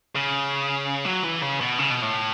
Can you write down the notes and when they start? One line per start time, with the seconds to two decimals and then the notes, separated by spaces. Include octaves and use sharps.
0.15 C#3
1.06 F#3
1.24 E3
1.42 C#3
1.60 B2
1.79 C#3
1.91 B2
2.03 A2